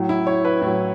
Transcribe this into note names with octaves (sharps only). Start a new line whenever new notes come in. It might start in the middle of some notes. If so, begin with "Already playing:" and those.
Already playing: A2 F#3
E4
C#5
B4
A2
F#3